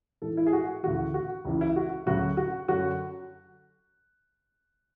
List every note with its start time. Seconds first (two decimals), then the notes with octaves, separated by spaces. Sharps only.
0.22 G#2 E3 A4
0.37 E4
0.47 G#4
0.53 F#4
0.83 D2 C#3 E3 F#4
1.14 F#4
1.45 C#2 C#3 E3
1.61 E4
1.76 F#4
2.06 D2 C#3 F#3 F#4
2.37 F#4
2.68 F#2 D3 F#3 F#4